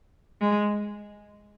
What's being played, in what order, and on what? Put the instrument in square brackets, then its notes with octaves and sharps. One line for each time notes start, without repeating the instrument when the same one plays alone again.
[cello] G#3